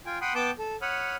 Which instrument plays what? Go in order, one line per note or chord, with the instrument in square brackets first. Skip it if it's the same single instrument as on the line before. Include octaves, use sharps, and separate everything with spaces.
[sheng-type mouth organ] F4 G5 G#5
F#5 G5 B5 C6 D#6
B3 G5 A5 D6 G6
A4
C#5 F#5 B5 D#6 F6